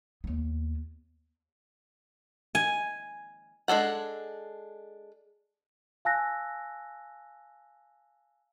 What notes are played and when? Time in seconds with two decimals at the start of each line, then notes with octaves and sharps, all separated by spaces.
0.24 D#2 B3
2.55 G#5
3.68 G#3 D4 A4 F#5
6.05 F5 G#5 A5 E6 F#6 A#6